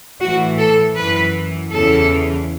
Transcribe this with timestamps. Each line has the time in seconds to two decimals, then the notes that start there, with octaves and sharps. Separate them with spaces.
0.21 A2 E3 F#4
0.59 A4
0.96 F#2 E3 B4
1.72 E2 C#3 E3 A4